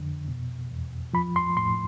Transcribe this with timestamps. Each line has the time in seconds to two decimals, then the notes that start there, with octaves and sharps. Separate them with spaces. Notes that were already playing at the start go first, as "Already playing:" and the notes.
Already playing: F2 D3
0.28 B2
0.71 E2
1.13 F3 B5
1.36 C6
1.57 A2 C6